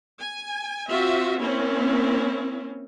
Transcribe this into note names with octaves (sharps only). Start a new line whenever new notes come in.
G#5
C4 F4 F#4 E5
A#3 C4 C#4 E4